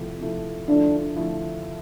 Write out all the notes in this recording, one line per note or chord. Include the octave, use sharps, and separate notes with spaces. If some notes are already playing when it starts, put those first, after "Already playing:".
Already playing: C3 F3 A3 E4
C3 F3 A3 E4
D3 F3 A3 D4 E4
D3 F3 A3 E4